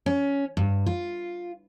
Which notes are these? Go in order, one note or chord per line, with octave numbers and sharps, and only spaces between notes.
C#4
G2
F4